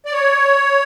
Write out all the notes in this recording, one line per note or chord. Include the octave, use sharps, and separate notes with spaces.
D5
C#5